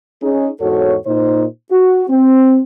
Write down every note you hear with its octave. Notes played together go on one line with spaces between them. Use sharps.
C#4 D#4 G#4
E2 G#2 F#4 A4 C#5
A#2 D#4 C5
F#4
C4